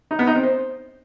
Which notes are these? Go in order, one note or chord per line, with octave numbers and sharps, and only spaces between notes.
D#4
B3
D#4
C4
C5